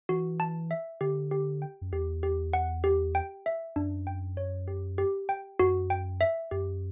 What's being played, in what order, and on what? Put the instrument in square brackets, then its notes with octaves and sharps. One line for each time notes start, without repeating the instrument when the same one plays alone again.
[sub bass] E3 [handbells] F#4
[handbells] A5
E5
[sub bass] D3 [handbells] G4
[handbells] G4
G5
[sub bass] F#2
[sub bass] E2 [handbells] G4
[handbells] G4
F#5
G4
G5
E5
[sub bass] F#2 [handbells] D4
[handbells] G5
C#5
G4
G4
G5
[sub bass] F#2 [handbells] F#4
[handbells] G5
E5
[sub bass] F#2 [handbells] G4